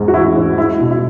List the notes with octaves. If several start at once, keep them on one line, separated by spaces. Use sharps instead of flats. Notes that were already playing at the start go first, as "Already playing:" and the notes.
Already playing: E2 G#2 G#3
F#4
E3 E4
G#2
G#3 E4
B2
E4